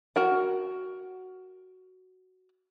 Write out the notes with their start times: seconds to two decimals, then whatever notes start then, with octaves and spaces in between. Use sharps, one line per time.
0.16 F#4 A#4 F#5